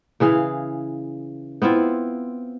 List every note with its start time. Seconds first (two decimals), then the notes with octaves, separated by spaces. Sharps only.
0.20 C#3 E3 G#4 F5
1.62 B3 C4 E4 F4